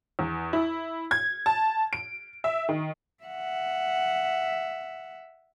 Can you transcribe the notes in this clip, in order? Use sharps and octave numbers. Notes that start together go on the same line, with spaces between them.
E2
E4
G#6
A5
D7
E5
D#3
E5 F#5